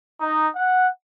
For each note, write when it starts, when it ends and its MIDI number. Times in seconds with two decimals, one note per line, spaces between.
0.21 0.48 63
0.56 0.89 78